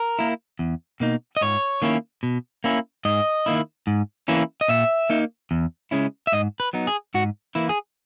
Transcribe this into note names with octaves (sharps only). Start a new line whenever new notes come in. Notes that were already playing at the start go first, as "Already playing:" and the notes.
Already playing: A#4
A#3 E4
E2
B2 A#3 D#4
D#5
G#2 C#5
D#3 A#3 C#4 E4
B2
A#3 C#4 E4
G#2 D#5
D#3 A#3 E4
G#2
E3 A#3 C#4 E4
D#5
A#2 E5
A#3 D#4
E2
C#3 G#3 C#4 E4
E5
G#2 D#5
B4
F#3 B3 D#4
G#4
G#2 F#4
E3 A#3 E4
G#4